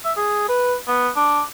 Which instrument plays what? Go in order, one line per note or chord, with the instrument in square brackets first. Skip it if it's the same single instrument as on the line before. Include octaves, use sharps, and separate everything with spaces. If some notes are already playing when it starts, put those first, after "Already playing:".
[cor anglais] E5
G#4
B4
B3
D4